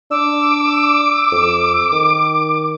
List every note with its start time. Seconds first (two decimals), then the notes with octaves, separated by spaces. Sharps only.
0.11 D4 D6 E6
1.32 F2
1.92 D#3